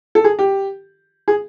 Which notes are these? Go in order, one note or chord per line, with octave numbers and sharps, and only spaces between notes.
A4
G#4
G4
G#4